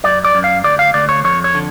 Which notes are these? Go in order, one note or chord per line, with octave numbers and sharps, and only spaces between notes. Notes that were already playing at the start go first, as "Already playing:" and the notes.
F#2 D5
D5
F#2
F5
D2 D5
F5
D2 D5
C#5
F2 C#5
C#5
D3